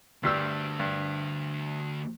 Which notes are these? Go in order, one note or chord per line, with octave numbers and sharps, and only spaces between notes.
D2 G2 G3 D4 E6
G2